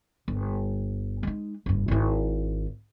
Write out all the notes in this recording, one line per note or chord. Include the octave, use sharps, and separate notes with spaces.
G1
G#3 D#4
F#1 G2
G#1 E4